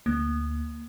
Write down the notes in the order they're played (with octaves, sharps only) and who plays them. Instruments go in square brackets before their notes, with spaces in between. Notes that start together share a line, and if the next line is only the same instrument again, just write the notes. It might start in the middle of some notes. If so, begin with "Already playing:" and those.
[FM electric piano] D2 [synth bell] A#3